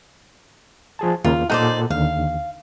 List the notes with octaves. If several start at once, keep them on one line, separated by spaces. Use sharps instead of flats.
F3 G#4 A5
D#2 C#3 A#3 F4
A#2 D#4 A4 C5 D5 F#5
D#2 D3 F5